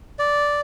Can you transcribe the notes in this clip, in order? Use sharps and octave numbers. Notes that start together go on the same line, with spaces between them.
D5